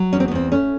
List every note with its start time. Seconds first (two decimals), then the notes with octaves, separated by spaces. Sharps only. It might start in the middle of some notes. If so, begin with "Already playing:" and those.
Already playing: F#3
0.13 E2 C#4
0.20 C4
0.28 B3
0.31 E2 C4
0.51 A3 C#4